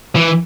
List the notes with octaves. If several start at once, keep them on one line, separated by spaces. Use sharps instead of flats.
E3